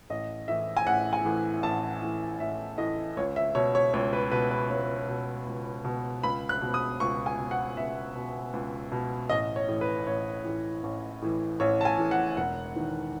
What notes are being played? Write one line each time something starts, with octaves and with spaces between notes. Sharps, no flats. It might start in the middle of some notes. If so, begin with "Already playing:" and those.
A1 D#5
A2 E3 E5
G#5
A1 F#5
G#5
A2 E3
A1 A5
A2 E3
A1 E5
A2 E3 D#5
C#2 C#5
E5
B2 C#5
C#5
C#2 C#5
B4
B2 B4
B4
C#2 C#5
B2
C#2
B2
C#2 B5
F#6
B2
D#6
C#2 C#6
G#5
B2
F#5
C#2 E5
B2
C#2
B2
A1 D#5
C#5
A2 E3
B4
A1 C#5
A2 E3
A1
A2 E3
A1 C#5
A5
G#5
A2 E3
F#5
E1 F#5
E2 D#3